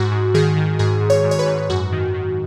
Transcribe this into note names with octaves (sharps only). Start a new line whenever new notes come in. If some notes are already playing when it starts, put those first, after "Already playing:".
Already playing: G#2 F#4
G#2
D#3 G#4
D#3
G#2 G#4
G#2
C#5
G#2
C#5
B4
G#2
F#2 F#4
D#3
D#3